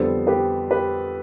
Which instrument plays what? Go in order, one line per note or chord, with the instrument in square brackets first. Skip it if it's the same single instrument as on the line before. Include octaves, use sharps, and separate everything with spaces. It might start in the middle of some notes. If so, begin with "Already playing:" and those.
Already playing: [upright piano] F2 D3 G3 B3 A4 C5
G4 B4
G4 B4